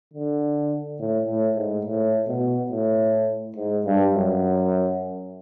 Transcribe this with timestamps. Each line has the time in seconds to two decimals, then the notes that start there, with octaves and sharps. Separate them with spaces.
0.14 D3
1.00 A2
1.29 A2
1.56 G#2
1.85 A2
2.28 B2
2.72 A2
3.57 G#2
3.86 G2
4.15 F#2